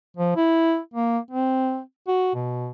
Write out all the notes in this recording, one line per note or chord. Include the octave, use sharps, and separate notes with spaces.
F3
E4
A#3
C4
F#4
B2